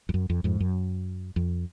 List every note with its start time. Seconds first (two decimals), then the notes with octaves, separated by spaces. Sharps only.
0.09 F2
0.14 F#2
0.30 F2
0.44 F2 G#2
0.60 F#2
1.36 F2